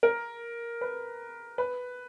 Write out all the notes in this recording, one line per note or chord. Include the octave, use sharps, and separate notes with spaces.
A#4
B4
B4